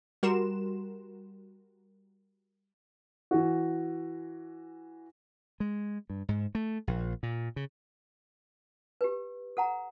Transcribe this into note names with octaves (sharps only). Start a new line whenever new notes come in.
G3 F#4 A#4 C6 E7
E3 F#4
G#3
G2
G#2
A3
A#1
A#2
C#3
G4 B4
A4 F#5 A#5